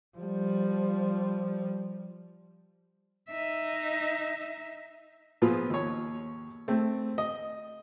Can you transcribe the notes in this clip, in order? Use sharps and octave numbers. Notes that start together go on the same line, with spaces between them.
F3 G3
D#4 E5
A#2 F3 B3 F4 G#4
D#2 C#5
A3 C4
D#5